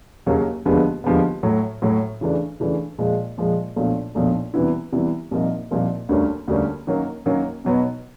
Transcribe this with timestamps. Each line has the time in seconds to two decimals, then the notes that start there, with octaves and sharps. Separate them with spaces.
0.26 D#2 C#3 F#3 A#3
0.65 D#2 D3 F3 G#3 B3
1.04 D#2 D3 F3 G#3 B3
1.43 A2 F#3 A3
1.82 A2 F#3 A3
2.21 C#3 E3 A3 D4
2.60 C#3 E3 A3 D4
2.98 A#2 F3 G#3
3.38 A#2 F3 G#3
3.76 B1 A#2 F3 A3 D4
4.15 B1 A#2 F3 A3 D4
4.54 C3 E3 G3 B3 E4
4.93 C3 E3 G3 B3 E4
5.31 C2 A#2 F3 A#3 D#4
5.71 C2 A#2 F3 A#3 D#4
6.09 D2 D3 G3 A#3 C#4
6.48 D2 D3 G3 A#3 C#4
6.87 F#2 D#3 F#3 A#3
7.26 F#2 D#3 F#3 A#3
7.65 B2 F#3 B3 D#4